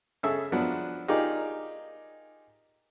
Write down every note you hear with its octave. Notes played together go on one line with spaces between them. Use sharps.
C#3 G#4 A4 E5
F3 F#3 B3 D4
D#4 F4 G4 G#4 A#4 D5